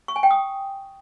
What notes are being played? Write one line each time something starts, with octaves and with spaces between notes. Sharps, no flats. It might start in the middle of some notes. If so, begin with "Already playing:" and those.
C#6
G#5
G5
D#6